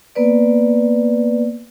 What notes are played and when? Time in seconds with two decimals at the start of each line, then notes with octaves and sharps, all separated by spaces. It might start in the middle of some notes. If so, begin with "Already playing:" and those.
0.15 A#3 B3 B4 D5